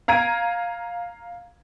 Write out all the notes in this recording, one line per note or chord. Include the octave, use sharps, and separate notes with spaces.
F5 A#5 G#6 D7 D#7